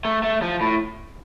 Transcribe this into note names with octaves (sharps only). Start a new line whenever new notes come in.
A3
A3
F3
A2